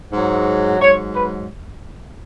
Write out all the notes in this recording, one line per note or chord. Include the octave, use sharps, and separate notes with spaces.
G#2 F#3
G#2 F#3 C#5
B4